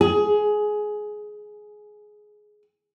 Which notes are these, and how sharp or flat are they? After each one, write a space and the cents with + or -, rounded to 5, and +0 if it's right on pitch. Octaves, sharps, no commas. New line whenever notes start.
G#4 +15